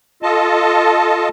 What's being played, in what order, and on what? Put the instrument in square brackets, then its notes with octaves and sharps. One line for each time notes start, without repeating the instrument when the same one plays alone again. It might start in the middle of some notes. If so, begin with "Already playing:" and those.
[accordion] F4 A4 D#5 A5